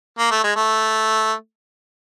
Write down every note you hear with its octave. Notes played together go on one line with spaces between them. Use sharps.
A#3
A3
G#3
A3